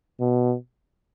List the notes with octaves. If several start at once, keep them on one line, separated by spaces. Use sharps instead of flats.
B2